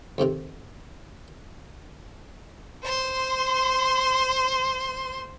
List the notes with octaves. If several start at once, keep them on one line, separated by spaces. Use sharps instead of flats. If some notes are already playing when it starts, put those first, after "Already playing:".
F2 G#2 C3 D#3
C5 C6